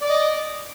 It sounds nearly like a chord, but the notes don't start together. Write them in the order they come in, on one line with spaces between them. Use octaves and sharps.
D5 D6 D#5